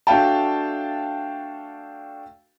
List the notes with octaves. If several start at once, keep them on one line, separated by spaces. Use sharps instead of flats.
A3 D4 F#4 F5 G5 A5